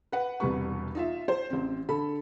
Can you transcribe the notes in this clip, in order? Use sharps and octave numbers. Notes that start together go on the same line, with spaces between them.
B4 F#5
E1 C2 G3 B4 C#6
D#4 F4 E5
C5
A1 C4
D3 A4 B5